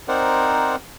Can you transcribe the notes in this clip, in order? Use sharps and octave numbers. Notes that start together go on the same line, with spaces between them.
C4 D#4 A#4 C5 D5 F#5